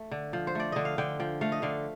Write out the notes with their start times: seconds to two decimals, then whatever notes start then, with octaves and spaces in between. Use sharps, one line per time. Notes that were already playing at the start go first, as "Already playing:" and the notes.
Already playing: A3
0.11 D3
0.33 F3
0.47 C5
0.55 A3 D5
0.72 D3 D#5
0.85 F5
0.98 D3 G5
1.20 F3 G5
1.41 A3 F5
1.52 D#5
1.62 D3 F5